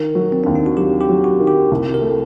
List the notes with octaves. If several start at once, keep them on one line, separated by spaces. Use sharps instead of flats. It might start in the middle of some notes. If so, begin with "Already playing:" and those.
Already playing: D#3 A#4
F#3
C4
D#2 D4
D#4
F#4
F#3 G4
G4
F#3
F#4
D#3
G4
C2
A#4
A3